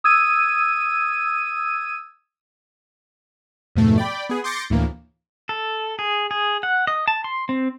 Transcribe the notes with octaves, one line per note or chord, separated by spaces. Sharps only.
D#6 E6 G#6 D#7
F2 G#2 B2 A3
D5 G5 B5
B3 G#4
C6 D6 G6 A6 A#6 C#7
D2 A2 E3 A#3
A4
G#4
G#4
F#5
D#5
A5
C6
C4